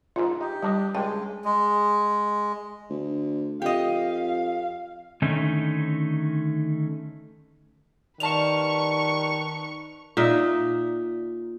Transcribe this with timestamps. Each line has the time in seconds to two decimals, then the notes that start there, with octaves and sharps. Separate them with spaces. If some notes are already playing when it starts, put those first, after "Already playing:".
0.16 A#1 G#2 F4
0.41 D#4 G4
0.63 G2 G3 D4 D#5
0.95 C#2 G2 G#3 G5
1.45 G#3
2.89 D2
3.62 F2 G4 D#5 F5
5.22 D3 D#3 A3 C#4 D#4
8.20 D#3 G3 F4 A#4 B4 A5 C#6 F7
10.17 A#2 D#4 E5